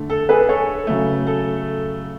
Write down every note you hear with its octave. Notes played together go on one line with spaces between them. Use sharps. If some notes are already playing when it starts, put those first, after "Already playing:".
Already playing: D3 A3
A4
G#4 B4
A4 C#5
C#3 F#3 A3
A4